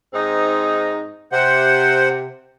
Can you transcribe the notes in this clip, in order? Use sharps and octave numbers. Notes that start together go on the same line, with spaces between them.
G#2 C4 D#4
C3 C5 F#5